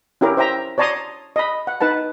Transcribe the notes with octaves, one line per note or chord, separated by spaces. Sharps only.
C#4 E4 G4 A#4
C5 E5 G5 A#5
C#5 D5 A5 A#5 C6 D#6
D#5 B5
F#5
D#4 B4 F#5 A5